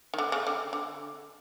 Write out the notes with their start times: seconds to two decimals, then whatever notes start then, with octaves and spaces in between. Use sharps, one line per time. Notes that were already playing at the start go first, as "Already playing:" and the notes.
0.14 D#3
0.18 D3
0.32 C#3
0.47 D3
0.73 D3